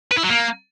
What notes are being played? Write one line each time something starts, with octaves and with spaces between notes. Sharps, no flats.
B4
E4
F#3
A#3